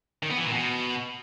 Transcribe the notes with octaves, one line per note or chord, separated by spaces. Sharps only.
D#3
B3
E3
A#2
B2